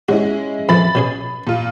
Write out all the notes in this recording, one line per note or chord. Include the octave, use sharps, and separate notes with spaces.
G#3 C#4 E4 F#4
F2 E3 B5 A6
B2 C#4 G#4
A#2 F4